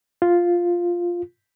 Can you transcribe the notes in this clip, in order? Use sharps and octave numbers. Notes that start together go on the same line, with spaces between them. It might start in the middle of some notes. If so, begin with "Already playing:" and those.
F4